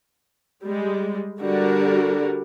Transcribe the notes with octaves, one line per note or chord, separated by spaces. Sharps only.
G3 G#3
D3 G3 D4 F#4 A#4